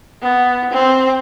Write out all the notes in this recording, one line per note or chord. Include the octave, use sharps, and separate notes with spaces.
B3
C4